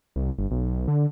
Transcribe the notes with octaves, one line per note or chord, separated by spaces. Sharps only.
C2
G1
B1
D3